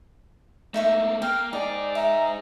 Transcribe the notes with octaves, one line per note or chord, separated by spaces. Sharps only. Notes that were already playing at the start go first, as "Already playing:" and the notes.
A3 A#3 D#4 E5 C#6
A#3 G5 F6
D#4 G#4 D5 A#5
E5 A#5